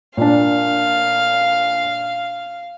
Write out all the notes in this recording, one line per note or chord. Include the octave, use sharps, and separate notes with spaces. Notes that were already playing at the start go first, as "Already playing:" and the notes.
A#2 D4 F5